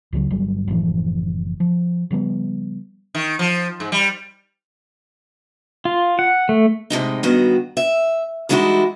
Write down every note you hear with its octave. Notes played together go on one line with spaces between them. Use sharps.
C#2 C#3 F3 F#3
G1 G2 F#3 G3
F#1 A2 E3 F3
F3
C#3 F3 G3 B3
D#3
F3
G#2
G3
F4
F#5
A3
A2 C3 G#3 D#4
G2 D#3 B3 F#4
E5
E3 G3 G#3 D#4 E4 F#4